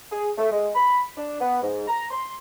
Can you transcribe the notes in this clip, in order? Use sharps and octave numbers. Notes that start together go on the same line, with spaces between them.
G#4
A3
G#3
B5
D4
B3
G#2
A#5
C6